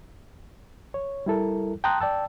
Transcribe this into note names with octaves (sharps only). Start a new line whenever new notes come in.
C#5
G3 E4 A4 A#4
G5 A5 A#5 C6 D#6 F#6
D5 G5 A5 E6